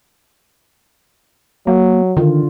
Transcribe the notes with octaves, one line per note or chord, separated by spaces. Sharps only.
F#3 A#3
D3 D#3 F4